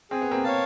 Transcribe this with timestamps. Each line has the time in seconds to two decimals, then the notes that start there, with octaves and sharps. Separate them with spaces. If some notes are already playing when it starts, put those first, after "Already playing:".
0.11 C4 G#4
0.21 B3
0.31 A#3 C4
0.44 C#5 F5 A5